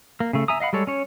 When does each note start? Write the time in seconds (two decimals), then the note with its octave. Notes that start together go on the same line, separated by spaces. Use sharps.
0.20 A#3
0.33 C#3 A3
0.48 E5 G#5 A#5 D#6
0.60 D#5 F5 F#5 B5
0.73 G3 G#3 A4 C#5
0.87 C#4 C#5